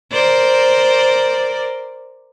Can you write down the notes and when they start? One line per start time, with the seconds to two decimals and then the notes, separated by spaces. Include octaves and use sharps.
0.12 A#4 C5 D5